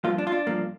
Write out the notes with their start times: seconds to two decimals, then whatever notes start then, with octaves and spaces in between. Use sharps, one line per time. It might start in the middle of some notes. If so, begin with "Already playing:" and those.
0.04 G2 F3 A#3 F4
0.18 D4
0.27 F4
0.32 D4
0.47 G2 F3 A#3